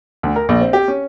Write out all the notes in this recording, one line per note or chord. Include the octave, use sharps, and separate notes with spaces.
D2
A#4
A#1
C4
G4
C#4